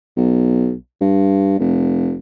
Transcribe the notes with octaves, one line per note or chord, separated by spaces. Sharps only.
B1
G2
F1